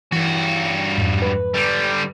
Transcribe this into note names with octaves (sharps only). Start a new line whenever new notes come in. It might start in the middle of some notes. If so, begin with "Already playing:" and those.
G2 E3 F#4
F2 G#2
B4
D3 G3